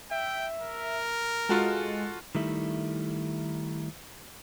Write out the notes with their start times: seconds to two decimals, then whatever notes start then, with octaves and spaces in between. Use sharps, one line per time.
0.11 E5 G5
0.61 A#4
1.49 G#3 F4 F#4 A4
2.35 D#3 G3 A3 E4